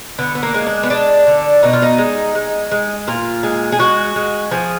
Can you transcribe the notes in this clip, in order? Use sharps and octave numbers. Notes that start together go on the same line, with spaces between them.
D3 B3
B3
A#3
G#3
D4
B3
G#3 D4
D3
B2 D#4
F4
D#4
G#3
G#3
G#3
A#2 F4
G#3
G#4
G#3 F#4
G#3
F3 G#4